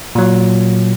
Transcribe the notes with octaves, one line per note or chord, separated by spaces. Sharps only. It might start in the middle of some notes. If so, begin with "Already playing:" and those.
A#2 F#3